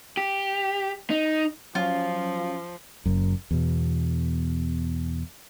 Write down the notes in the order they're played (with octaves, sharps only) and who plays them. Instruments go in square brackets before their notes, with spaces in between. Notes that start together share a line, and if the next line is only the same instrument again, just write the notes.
[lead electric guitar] G4
D#4
[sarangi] F3 [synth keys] F#3 C#4 [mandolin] F4
[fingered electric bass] F#1 F#2
E2 B2